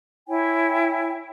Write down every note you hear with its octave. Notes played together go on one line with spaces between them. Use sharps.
E4 C#5 G5 G#5